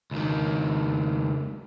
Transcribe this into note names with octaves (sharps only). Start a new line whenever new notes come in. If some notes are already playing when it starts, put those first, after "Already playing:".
C#2 D#3